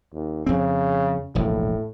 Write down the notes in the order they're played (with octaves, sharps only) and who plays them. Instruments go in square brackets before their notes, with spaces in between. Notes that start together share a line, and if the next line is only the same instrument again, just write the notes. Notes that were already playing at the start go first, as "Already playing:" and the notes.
[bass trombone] D#2
[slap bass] F2 C4 [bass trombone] C#3
[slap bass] E1 A#1 [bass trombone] A2